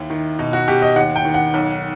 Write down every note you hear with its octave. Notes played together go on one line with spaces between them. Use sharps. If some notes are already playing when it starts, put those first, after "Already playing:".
Already playing: D#2 E4
D#3
B2 D#4
F#4
B2 G4
D#5
D#2 F#5
G5
D#3
F#5
B1